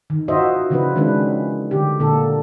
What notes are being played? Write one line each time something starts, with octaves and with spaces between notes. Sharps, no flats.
D#3
D#4 F4 F#4 C5 D#5 E5
C#3 E3 F3 D4 E4 B4
D#3 E3 G#3 C#4 D4 B4
D3 G3 G4
A#2 D3 A#3 A4